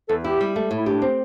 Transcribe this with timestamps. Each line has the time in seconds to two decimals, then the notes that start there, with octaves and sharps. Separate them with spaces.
0.09 E2 A4
0.24 E4 G4
0.41 G3
0.56 A3
0.71 A2
0.77 E4
0.86 D4 G4
1.02 C4